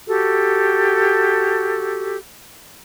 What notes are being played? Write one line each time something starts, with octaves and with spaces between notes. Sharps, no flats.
F#4 G4 A4